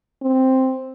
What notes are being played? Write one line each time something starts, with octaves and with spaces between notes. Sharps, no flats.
C4